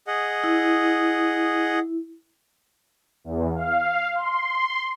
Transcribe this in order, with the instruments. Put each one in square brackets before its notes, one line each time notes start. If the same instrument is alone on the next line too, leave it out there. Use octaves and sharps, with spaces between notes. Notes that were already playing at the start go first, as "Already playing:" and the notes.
[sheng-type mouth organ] G#4 D#5 F#5
[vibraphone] E4
[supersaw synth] E2
F5
C6